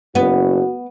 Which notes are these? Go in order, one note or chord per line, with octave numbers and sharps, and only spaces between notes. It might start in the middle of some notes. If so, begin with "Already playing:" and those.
F#1 B3 F#4